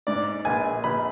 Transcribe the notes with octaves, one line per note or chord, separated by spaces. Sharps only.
G#2 D5
A#1 G#5
A#1 B5